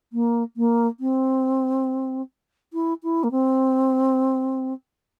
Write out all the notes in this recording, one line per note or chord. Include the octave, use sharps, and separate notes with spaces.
A#3
A#3
C4
E4
E4
A#3
C4